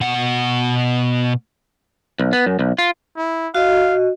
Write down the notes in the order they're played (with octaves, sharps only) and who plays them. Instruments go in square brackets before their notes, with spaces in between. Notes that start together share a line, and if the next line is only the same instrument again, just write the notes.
[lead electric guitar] B2 F#5
B1
B3
F#2
B1
F4
[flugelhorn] E4
[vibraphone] F#4 D#5 [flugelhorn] F5